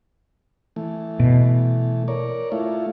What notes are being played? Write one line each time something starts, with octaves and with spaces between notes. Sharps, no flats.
E3 A3
B2
A#4 C#5 D5
A3 E4 F4